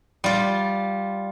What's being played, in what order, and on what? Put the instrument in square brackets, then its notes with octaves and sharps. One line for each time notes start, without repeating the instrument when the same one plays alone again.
[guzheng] G3 F4